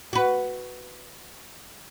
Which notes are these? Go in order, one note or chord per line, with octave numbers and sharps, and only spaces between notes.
F#4 B4